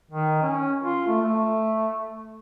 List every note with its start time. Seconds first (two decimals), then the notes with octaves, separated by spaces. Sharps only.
0.11 D#3
0.42 C#4
0.83 F4
1.08 A3
1.21 A3